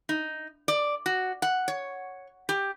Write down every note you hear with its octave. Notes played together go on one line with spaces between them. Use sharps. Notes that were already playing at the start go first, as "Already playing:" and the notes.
D#4
D5
F#4
F#5
C#5
G4